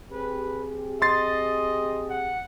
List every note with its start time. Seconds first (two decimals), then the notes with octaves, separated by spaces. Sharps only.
0.12 C4 G4 G#4 B4
1.02 D#5 C6 A6 C7
2.10 F#5